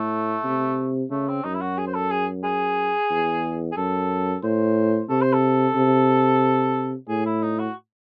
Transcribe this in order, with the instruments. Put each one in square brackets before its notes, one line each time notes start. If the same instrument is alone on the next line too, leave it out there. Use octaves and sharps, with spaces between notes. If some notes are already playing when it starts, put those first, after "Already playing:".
Already playing: [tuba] A2 [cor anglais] A3
[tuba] C3
[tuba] C#3 [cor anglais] A3
[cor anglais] C4
[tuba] F#2 [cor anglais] D#4
[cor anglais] E4
F#4
G#4
C5
A4
G#4
G#4
[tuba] E2
[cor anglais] G#4
[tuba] F#2 [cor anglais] A4
[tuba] A2 [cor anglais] C5
[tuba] C3 [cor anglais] A4
[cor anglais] C5
A4
[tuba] C3
[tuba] A2 [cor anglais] G#4
[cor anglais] E4
D#4
F#4